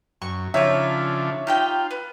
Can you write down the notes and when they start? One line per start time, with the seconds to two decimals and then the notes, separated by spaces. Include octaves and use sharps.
0.22 F#2 C#6
0.54 C#3 F3 D4 D#4 F4 C#5 E5
1.47 D#4 F4 G4 G5
1.91 B3